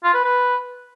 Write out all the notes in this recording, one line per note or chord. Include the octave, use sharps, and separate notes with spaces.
F4
B4
B4